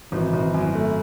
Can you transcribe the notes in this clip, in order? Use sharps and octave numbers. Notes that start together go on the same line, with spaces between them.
G#1 E3
G#1
F#2
A3